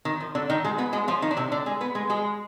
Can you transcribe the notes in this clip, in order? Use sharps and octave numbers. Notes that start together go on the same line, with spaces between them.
D#3
F3
D3 D4
D#3 D#4
G#3 G#4
B3 B4
G#3 G#4
F3 F4
D#3 D#4
D4
C3 C4
D3 D4
G#3 G#4
B3 B4
G#3 G#4
G#3 G#4